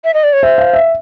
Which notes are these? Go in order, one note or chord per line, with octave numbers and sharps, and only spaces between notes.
E5
D#5
D5
C#5
C5 E5
F5
E5